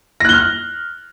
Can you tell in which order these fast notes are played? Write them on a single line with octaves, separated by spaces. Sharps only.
A#6 F#6 G7 F6